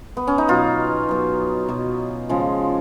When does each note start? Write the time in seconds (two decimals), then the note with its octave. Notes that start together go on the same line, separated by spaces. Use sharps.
0.17 B3
0.27 C#4
0.38 D#4
0.48 B2 F#3 F4
1.09 B2 F#3
1.69 B2 F#3
2.29 C#3 F3 G#3